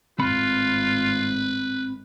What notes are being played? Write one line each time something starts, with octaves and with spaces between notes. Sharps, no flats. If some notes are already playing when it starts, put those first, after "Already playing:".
G#1 A2 C4 F4 B4 B5